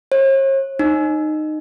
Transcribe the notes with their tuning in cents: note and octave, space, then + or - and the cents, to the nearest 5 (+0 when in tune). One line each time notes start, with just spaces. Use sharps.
C#5 -45
D#4 -15